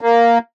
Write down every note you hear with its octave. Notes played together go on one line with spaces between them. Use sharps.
A#3